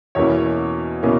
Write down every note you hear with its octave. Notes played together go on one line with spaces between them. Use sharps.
E2 B2 A#3 C#4 E4 C#5
B2 A#3 C#4 E4